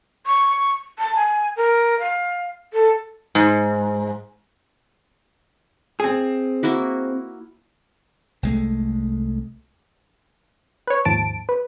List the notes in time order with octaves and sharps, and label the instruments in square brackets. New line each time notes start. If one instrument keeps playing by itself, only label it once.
[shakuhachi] C#6
A5
G#5
A#4
F5
A4
[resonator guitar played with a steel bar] G#2
[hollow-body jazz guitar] C4 G#4
[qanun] A#3 E4 F#4
[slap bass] C2 G#3 A3
[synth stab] B4 C#5
D#2 G#2 F3 A5 D7
B4